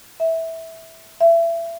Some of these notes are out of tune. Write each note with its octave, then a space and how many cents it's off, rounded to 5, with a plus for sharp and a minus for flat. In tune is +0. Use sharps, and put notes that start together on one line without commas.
E5 -15
E5 +30